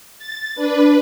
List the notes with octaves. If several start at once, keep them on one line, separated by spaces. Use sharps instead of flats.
A6
D4 B4